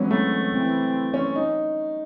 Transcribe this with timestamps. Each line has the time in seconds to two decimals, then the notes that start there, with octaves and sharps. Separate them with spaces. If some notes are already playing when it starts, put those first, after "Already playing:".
Already playing: E3 F#3 G#3 C4 C#4
0.11 A3
0.52 E3 C4
1.14 C#4
1.36 D#4